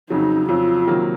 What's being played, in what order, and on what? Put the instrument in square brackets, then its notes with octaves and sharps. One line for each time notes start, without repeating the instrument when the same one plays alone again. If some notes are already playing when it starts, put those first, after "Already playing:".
[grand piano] F2 C#3 F#3 [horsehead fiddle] D#4
[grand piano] F2 C#3 F#3 [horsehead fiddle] F4
[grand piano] C3 D#3 F#3 A#3